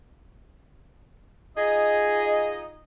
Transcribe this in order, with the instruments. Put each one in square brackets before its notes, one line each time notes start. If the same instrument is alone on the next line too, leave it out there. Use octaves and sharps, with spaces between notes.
[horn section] D#4 F4 D#5 [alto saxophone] G#4